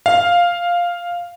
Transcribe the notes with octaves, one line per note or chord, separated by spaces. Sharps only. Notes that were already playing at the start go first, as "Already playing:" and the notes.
F5